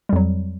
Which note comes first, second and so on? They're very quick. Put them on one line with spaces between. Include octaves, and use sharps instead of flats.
G3 F2 F#3